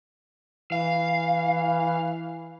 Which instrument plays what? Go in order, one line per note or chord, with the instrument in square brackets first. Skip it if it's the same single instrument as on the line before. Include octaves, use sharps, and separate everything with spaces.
[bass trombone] E3 [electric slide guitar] F5